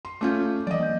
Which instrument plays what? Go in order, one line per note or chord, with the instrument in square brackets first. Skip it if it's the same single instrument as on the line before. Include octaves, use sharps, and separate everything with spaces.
[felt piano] C6
[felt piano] A3 C#4 F4 [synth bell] D6 G6
[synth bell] E3 F#3 [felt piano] D5 D#5
[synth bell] A#3 G6